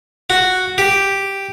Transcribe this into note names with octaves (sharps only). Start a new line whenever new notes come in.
F#4
G4